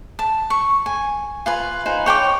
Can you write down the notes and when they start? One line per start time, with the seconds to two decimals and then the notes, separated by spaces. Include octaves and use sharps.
0.19 A5
0.50 C#6
0.86 G#5
1.46 F4 B4 G#5
1.86 D#4 B4 C5 G#5
2.06 C#5 G5 A5 D6